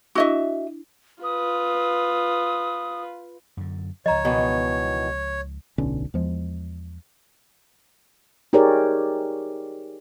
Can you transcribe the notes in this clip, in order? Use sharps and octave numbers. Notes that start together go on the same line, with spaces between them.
D4 E4 F#4 D#5 E5
F4 B4 D#6
F#2 D3
C#2 F3 C#5 D#5 A#5
B2 D#3 E3
D1 B1 D3 C#4
E2 F3 G#3
D#4 G4 G#4 A#4 C#5 D5